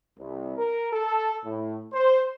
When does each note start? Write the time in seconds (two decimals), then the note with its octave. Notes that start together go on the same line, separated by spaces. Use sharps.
0.18 C2
0.56 A#4
0.91 A4
1.44 A2
1.93 C5